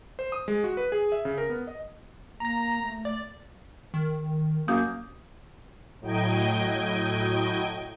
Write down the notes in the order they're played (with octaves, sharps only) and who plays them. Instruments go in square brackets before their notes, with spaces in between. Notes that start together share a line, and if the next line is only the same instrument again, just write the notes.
[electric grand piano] C5
D#6
G#3
F#4
B4
G#4
E5
C#3
A#4
B3
D#5
[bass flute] A#3 [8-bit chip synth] A#5 A#6
[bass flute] A3
[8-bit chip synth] D5
[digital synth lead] D#3
[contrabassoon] F#2 [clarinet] A#3 [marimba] D#6 G6
[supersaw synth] A2 F#3 D#5 G5 G6 G#6